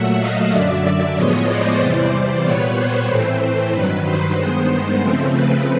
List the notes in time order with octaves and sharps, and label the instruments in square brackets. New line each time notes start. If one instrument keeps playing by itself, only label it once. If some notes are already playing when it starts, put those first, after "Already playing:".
Already playing: [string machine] A#2 F#3 A3 E5 F#5
D#5 F5
F#2 D3 F#3 D5 E5
A2 F3 G#3 B3 C#5 D#5
C5 D5
E2 C3 E3 G3
A#2 G3 B3 B4 C#5
C5
A2 E3 A3 C4
G2 D#3 F#3 B4
C5
G2 D#3 G#3 B3 C5
C#3 F3 A3 C4
B4